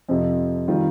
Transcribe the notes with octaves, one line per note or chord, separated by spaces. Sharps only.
F2 C3 F3
D#3 G3 C4 F4